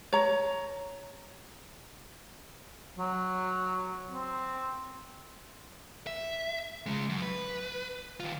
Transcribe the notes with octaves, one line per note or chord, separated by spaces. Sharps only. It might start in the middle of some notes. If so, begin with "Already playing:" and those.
C#5 A#5
F#3
C4
E5
C#3 G#3
F#2
B4
D#3 F4